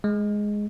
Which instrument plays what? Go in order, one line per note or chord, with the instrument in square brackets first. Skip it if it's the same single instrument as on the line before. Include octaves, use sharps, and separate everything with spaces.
[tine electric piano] G#3